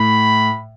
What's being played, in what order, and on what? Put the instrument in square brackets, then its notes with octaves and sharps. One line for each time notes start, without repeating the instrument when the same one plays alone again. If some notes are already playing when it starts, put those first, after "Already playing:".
Already playing: [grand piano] A2 [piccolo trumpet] B5